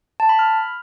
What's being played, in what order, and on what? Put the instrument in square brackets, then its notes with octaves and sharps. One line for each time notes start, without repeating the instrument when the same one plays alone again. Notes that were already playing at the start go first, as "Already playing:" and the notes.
[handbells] A5
B5
F6